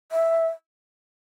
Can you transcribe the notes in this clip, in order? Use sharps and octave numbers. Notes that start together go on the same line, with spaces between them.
E5